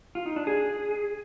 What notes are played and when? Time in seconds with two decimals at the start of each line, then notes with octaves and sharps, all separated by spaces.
0.15 F4
0.26 D#4
0.36 D4
0.47 G#4